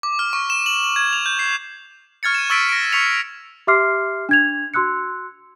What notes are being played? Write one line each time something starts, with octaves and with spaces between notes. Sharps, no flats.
D6
F6
C#6
E7
F#7
F#7
G#6
F7
G6
C7
C#6 F6 G#6 A6 C#7
D#7 E7
C#6 E6 A6 B6 D7 D#7
A#6 D7
C#6 A6 B6 C#7 F7
G4 E5 C6 D6 F6 C7
D4 G#6 F7
F#4 C6 E6 F#6 C#7